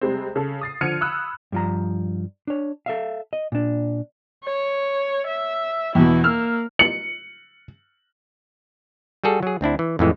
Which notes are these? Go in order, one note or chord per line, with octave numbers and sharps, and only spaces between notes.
C3 G3 G#3 C4
C#3 A4
D#6 A6 C7
D3 F3 F6 G#6 C#7 D#7
B5 D#6 E6 F#6
G2 F3 A#5
D4 C#5
A4 E5 F5
D#5
A#2 D4
C#5
E5
E2 B2 E4
A#3 E6 F6
C#7 F#7
G3 F#4 G#4 A4
F#3 G#4
D2 C4 D4 E4
E3
F2 A2 E3 G#3